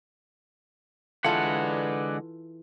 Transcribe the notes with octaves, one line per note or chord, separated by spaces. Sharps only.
D3 E3 G#3 F4 A4 B4 D5 F#5